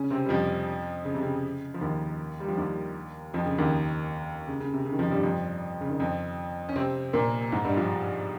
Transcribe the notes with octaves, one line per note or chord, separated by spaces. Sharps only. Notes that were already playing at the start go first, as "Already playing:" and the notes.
Already playing: C#3 C#4
C3 C4
G3
F2 F3
C#3
C3
C#3
F3
D#2 D#3
G3
F3
D#2 D#3
F2 F3
C#3
D#2 D#3
C#3
C#3
C3
C#3
D#3
F2 F3
G2 G3
F2 F3
C#3
D#3
F2 F3
C#4
C3 C4
A#2 A#3
G#2 G#3
G2 G3
F3 F4